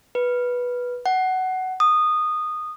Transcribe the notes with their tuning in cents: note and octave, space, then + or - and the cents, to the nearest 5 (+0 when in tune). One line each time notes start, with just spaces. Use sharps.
B4 -10
F#5 +15
D#6 -15